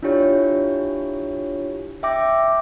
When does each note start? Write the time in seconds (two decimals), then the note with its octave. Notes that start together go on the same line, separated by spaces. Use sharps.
0.03 D4 E4 F4 G4 C#5
2.03 E5 G5 D6 A#6